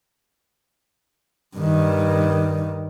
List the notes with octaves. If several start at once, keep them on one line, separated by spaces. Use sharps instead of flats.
G2 D#3